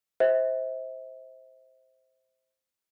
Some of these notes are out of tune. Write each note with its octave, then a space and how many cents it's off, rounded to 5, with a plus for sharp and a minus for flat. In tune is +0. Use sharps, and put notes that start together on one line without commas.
C5 +0 E5 -35